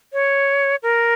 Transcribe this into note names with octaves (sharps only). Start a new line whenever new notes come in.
C#5
A#4